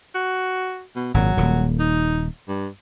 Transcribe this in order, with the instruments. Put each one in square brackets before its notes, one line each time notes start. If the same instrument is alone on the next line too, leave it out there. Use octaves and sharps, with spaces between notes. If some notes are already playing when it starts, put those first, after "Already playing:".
[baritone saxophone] F#4
B2
[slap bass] G#1 A#2 [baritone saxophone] F#3
[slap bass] D#1 A#2
[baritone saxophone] D#4
G2